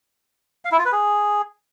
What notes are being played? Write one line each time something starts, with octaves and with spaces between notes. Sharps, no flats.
F5
E4
F4
B4
G#4